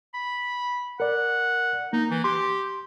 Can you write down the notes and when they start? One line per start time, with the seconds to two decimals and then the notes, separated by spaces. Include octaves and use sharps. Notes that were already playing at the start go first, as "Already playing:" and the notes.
0.14 B5
1.00 A#4 D5 F#5
1.93 A#3 D#4
2.11 E3
2.24 G4 C6